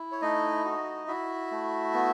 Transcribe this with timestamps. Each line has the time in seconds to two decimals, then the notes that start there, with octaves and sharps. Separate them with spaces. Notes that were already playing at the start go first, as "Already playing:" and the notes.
Already playing: E4
0.12 C#5
0.22 A3 D#4 D#5
0.65 F#4
1.08 E4 F#4 E5
1.51 A3
1.94 B3